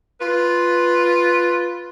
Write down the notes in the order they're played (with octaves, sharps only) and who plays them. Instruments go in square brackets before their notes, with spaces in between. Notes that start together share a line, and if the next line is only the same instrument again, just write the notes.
[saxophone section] F4 B4